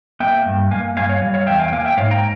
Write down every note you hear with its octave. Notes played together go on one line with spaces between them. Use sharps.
A#3 E5 G5
G2
A#3 F5 G#5
G2 F5 G#5
C#5 F5
G3
C#5 F5
E2 E5 G5
F5 G#5
G5
A#3 F5 G#5
E5 G5
G#2 C#5 F5
G5 A#5